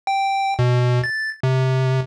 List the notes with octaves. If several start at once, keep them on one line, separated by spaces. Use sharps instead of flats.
G5
B2
A6
C3